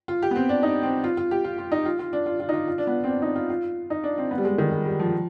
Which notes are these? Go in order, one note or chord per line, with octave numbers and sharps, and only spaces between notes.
F4
G4
B3
C4
D4
D#4
C4
F4
F4
G4
F4
F4
D#4
F4
F4
D4
F4
F4
D#4
F4
F4
D4
B3
C4
D4
D#4
F4
F4
D#4
D4
C4
B3
G3
G#3
D#3
G#3
G3
F3